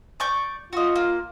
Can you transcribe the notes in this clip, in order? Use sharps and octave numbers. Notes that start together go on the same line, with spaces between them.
D5 C#6 G6
F4 F#4 D#5
A#3